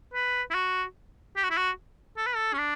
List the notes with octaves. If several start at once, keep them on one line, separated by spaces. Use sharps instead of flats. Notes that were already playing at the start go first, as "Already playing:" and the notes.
B4
E4
F#4
G4
F#4
E4
F#4
A4
B4
A4
C#4
D4